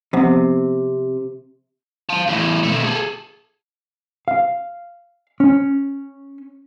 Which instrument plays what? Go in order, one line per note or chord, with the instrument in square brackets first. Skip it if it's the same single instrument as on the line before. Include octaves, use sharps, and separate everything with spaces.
[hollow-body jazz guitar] C3 [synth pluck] F3 B3
[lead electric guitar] F5 A5
E2 A2
B2 A3
G#4 A4
[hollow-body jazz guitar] F5
C#4